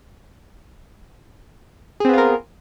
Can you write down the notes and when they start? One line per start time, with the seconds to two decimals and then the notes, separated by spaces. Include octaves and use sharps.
2.00 G#4
2.05 C4
2.09 B3
2.13 F4
2.18 A#4